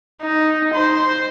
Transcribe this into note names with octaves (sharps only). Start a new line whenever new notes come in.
D#4
C5